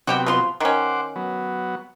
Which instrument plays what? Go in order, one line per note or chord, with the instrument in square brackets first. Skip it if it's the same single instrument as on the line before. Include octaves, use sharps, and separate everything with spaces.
[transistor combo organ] C3 F#3 B3 [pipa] F#4 G4 G5
[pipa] F3 F4 C6
[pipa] D#3 C#4 [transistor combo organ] C5 F#5 D6
[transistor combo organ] F#3 B3